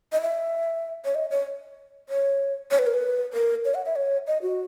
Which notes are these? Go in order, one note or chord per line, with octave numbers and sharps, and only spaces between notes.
D#5
E5
C#5
D#5
C#5
C#5
C#5
B4
A#4
B4
A#4
C#5
F#5
E5
C#5
D#5
F#4